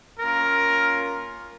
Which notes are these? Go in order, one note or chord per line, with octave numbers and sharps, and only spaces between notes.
A#3 C#4 F4 A#4